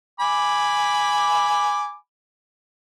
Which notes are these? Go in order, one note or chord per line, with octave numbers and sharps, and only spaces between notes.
G#5 B5 D6